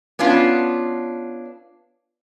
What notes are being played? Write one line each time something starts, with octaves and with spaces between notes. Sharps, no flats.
B3 C#4 D4 F4